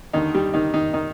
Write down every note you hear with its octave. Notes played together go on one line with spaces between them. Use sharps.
D#2 D3 D#3 D#4
G3 G4
D#3 D#4
D#3 D#4
D#3 D#4